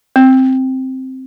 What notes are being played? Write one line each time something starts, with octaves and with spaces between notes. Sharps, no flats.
C4